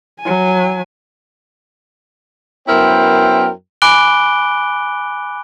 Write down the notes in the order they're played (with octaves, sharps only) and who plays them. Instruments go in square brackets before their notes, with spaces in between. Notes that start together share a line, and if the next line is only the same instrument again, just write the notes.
[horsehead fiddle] F#3 G#5
[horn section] F#2 B3 E4 A#4 C5 G5
[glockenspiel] G#5 B5 D6 F#6 D7 G7